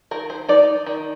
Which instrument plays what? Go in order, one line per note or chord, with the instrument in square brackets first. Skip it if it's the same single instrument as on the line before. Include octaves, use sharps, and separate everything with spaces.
[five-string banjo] D#3 A#4
C5
D#4 D5
D#3